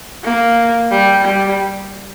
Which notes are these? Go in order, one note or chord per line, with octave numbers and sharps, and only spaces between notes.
A#3
G3
G3